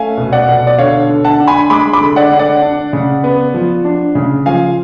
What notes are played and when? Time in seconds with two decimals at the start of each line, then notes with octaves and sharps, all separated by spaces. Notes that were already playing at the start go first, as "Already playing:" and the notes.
Already playing: A3 C#4 F5 G#5
0.18 B2
0.32 D5 F#5
0.48 B2
0.67 D5
0.78 D3 C#5 F5
1.09 D3
1.25 F#5 A5
1.40 D4
1.47 G#5 B5
1.70 G#3 B5 D6
1.93 B5 D6
2.01 D3
2.16 D5 F#5
2.32 D3
2.39 D5 F#5
2.62 D4
2.93 C#3
3.24 B3
3.54 F3
3.85 D4
4.15 C#3
4.46 F3 F5 G#5